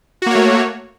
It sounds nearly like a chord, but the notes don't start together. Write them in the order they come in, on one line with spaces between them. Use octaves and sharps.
F#4 A#3 C#5 A3